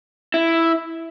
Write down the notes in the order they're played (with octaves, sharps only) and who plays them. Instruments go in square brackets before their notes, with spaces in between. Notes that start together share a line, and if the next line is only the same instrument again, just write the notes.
[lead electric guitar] E4